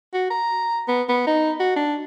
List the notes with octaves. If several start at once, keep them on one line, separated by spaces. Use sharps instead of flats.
F#4
A#5
B3
B3
D#4
F#4
D4